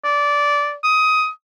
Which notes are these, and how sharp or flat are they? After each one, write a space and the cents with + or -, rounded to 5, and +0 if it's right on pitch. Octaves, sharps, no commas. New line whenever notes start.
D5 -15
D#6 +15